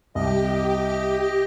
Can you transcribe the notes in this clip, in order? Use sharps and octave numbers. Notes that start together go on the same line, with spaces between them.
C2 G4 D#5